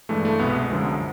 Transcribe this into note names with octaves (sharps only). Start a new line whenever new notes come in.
G2 E3 G#3 A3
A3
C2 B2 G#3 B3
F#2 D3 F3 G#3